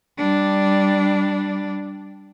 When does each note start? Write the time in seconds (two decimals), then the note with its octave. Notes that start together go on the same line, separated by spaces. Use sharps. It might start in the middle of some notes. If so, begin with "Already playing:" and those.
0.18 G3 D4